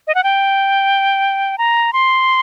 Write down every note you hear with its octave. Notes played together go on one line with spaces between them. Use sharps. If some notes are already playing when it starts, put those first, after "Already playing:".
D#5
F#5
G5
A#5
C6